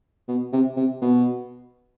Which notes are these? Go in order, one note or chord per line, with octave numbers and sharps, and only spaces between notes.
B2
C3
C3
B2